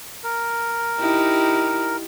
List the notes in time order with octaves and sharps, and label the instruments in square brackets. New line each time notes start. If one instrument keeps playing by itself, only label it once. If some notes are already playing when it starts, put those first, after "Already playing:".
[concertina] A#4
[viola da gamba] D#4 E4 G4